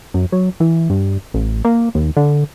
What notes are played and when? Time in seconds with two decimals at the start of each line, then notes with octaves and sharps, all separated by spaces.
0.14 F#2
0.32 F#3
0.60 E3
0.90 G2
1.34 A1
1.65 A#3
1.95 D#2
2.17 D3